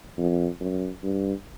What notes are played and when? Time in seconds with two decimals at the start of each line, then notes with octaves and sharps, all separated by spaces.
0.18 F2
0.60 F#2
1.03 G2